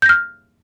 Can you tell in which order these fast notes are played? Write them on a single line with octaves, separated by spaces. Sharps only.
G6 A#6 F6